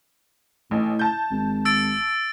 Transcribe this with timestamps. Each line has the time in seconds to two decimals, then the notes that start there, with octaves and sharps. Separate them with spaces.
0.71 A1 A2
0.99 A5 G6
1.31 G#1
1.65 E6 A6 D7